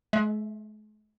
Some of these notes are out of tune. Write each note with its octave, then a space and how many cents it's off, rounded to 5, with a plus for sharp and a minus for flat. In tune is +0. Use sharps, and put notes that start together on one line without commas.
G#3 +45 E5 +0